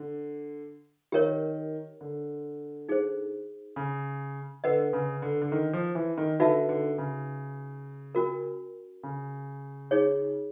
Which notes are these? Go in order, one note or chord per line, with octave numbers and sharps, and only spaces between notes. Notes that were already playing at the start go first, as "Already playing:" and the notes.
Already playing: D3
D#3 G4 A#4 C#5
D3
D#4 G#4 C5
C#3
D3 B4 D#5 F#5
C#3
D3
D3
D#3
F3
E3
D#3
D3 D#4 F#4 B4 E5 A5
D3
C#3
C#4 F#4 A#4
C#3
D#4 G#4 C#5